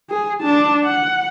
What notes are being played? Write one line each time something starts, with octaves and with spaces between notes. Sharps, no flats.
G#4
D4 A5
F#5